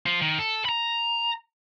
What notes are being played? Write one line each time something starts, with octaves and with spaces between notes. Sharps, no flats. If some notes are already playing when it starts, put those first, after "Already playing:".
F3 F4
D#3
A4
A#5 B5